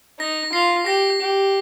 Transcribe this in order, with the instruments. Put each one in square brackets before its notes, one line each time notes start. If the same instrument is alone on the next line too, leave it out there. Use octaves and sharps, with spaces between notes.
[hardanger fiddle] D#4 [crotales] A#6
[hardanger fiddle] F4 [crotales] C7
[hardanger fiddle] G4 [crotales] A#6
[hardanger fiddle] G4